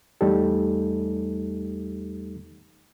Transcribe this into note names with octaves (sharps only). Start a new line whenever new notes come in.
E2 G3 A3 D#4 G4 A4